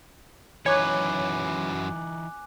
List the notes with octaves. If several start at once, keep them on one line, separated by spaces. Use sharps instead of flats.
F#2 E3 D#4 B4 C#5 G#5 D6 F#6